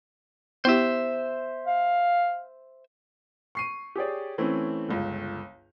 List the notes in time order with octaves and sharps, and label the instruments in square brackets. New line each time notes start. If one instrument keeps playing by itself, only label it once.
[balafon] B3 E4 G4 [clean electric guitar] C5 E5
[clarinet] F5
[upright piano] C#6 C7 D#7
G4 G#4 C#5 D5
E3 A3 C4 C#4
G1 C#2